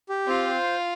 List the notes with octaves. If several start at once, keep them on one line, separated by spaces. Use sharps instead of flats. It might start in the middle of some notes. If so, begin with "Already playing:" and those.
G4
C4 F4
C5